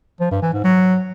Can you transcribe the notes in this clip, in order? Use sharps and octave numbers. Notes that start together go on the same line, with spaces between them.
F3
G2
E3
G#2
F#3